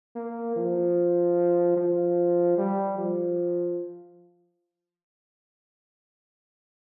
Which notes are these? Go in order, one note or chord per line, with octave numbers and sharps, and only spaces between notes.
A#3
F3
F3
G3
F3